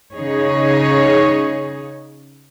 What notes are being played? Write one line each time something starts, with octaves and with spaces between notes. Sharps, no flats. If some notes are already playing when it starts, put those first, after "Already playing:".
C#3 D#4 G#4 C#5